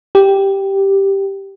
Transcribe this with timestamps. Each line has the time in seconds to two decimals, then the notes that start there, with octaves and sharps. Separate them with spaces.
0.15 G4